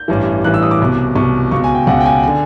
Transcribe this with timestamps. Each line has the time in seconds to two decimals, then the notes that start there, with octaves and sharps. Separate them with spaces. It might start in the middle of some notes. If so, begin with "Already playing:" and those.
Already playing: G6
0.08 A1 G2 E3
0.44 A1 G2 E3 F#6
0.54 E6
0.63 D#6
0.71 D6
0.81 C2 B2
1.16 C2 B2 C#6
1.51 C#2 B2 C#6
1.64 G#5
1.75 G5
1.87 C#2 B2 F#5
2.01 G5
2.06 G#5
2.23 D3 G#5